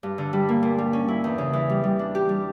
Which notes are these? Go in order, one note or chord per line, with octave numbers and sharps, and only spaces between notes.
G2
D3
G3
A#3
A#2
G3
C#4
E4
E2
C#3
E3
G3
G3
D4
G4
G3